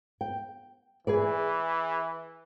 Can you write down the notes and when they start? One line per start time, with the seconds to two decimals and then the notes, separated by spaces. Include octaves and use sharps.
0.21 G5
1.07 E3 G#4 B4 D5